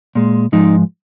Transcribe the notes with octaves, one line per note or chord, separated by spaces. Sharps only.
A#2 G#3
G#2 F3 G#3 D#4